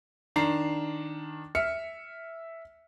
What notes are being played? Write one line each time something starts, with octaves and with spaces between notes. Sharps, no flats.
D#3 D4 A#5 C7
E5 F6 C#7